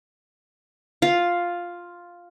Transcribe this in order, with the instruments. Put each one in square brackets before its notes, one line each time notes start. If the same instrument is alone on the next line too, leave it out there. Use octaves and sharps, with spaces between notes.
[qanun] F4